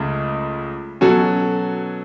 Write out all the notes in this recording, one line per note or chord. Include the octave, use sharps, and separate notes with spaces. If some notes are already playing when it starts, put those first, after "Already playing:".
Already playing: C#2 C#3 A3
B2 F#3 C#4 F#4 A4